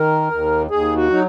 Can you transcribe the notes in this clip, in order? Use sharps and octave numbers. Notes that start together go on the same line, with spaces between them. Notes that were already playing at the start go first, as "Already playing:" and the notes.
Already playing: D#3 A#4
D#2
D#2 G#4
F#4
F#3 D#4